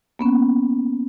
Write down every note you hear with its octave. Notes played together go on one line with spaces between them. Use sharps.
A#3 B3 C#4